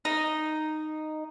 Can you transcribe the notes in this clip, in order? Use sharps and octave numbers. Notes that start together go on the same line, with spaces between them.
D#4